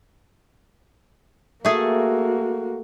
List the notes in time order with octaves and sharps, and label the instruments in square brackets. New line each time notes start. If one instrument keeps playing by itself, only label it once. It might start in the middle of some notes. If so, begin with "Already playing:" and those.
[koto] A3 G#4 A4 [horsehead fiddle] A#3 F#4